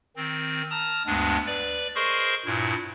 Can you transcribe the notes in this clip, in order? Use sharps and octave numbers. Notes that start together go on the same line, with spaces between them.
D#3 C4
A5 A#5 D#6 F6
D2 G2 G#3 B3 D4
B4 D5
G#4 A#4 C5 D#5 C6 C#6
G2 A#2 E4